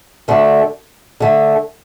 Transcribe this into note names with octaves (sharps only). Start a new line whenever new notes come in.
D2 D3 A3 D4
D3 A3 D4